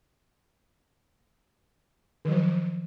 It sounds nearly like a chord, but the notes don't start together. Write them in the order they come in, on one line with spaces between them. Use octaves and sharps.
D#3 F#3 F3